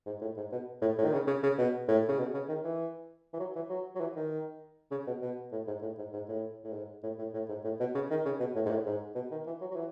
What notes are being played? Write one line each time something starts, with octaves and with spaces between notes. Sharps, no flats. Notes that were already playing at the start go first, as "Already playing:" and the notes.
G#2
A2
G#2
B2
A2
A2
D#3
C#3
C#3
C#3
B2
A2
C#3
B2
C#3
D#3
E3
E3
F#3
E3
F#3
F#3
E3
D#3
C#3
B2
B2
A2
G#2
A2
G#2
G#2
A2
A2
G#2
A2
A2
A2
G#2
A2
B2
C#3
D#3
C#3
B2
A2
G#2
A2
G#2
B2
D#3
E3
F#3
F#3
E3